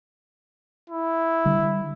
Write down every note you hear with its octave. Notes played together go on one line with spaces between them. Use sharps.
E4
D3 G3